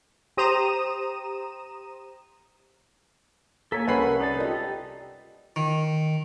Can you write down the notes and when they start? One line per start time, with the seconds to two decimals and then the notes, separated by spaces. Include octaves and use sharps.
0.37 G4 C5 A#5 D#6 D#7 E7
3.72 A#3 A4 C#5 G#5 A#5 B6
3.88 C2 C#4 A#4 B4 F#5 B5 C7
4.20 D#4 A4 D5 A5
4.40 F4 G4 D#5
5.56 D#3